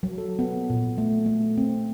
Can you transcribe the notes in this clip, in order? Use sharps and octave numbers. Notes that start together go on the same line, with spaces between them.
F#3
A4
B3
A#2
A3
A3
C4